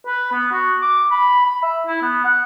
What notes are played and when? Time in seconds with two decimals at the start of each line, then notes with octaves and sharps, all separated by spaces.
0.06 B4
0.32 B3
0.52 F#4
0.82 D6
1.11 B5
1.44 B5
1.63 E5
1.87 E4
2.02 B3
2.24 F#5